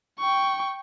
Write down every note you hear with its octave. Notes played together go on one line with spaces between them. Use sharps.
G5 C#6